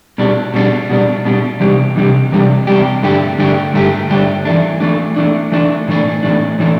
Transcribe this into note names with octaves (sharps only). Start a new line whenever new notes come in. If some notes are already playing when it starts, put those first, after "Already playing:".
B2 G3 D4
B2 G3 D4
B2 G3 D4
B2 G3 D4
E2 C3 G3 D4 G4
E2 C3 G3 D4 G4
E2 C3 G3 D4 G4
E2 C3 G3 D4 G4
G2 D3 A3 D4 G4
G2 D3 A3 D4 G4
G2 D3 A3 D4 G4
G2 D3 A3 D4 G4
E3 A3 D4
E3 A3 D4
E3 A3 D4
E3 A3 D4
A2 E3 A3 D4
A2 E3 A3 D4
A2 E3 A3 D4